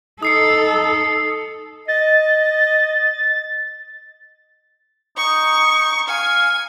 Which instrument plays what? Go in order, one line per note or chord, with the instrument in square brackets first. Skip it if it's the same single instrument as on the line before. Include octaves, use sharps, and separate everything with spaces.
[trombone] D#4 [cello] A4 [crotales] D#6 C7 C#7
[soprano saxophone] D#5 [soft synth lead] A6
[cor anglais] D#4 [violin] C#6
[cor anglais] D#4
[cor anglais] F5 [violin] G#5